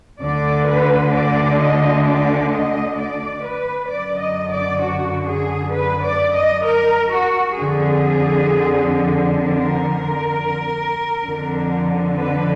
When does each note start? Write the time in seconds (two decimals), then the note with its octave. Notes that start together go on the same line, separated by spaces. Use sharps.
0.21 D2 D3 D5
0.67 B4
1.13 D5
1.59 D#5
2.05 D5
2.52 D#5
2.97 D5
3.43 B4
3.89 F#2 D3 D5
4.20 D#5
4.51 D5
4.81 F#4
5.27 G#4
5.73 B4
6.03 D5
6.35 D#5
6.65 A#4
7.11 F#4
7.57 F2 D3 G#4
9.41 A#4
11.25 F2 D3
12.17 B4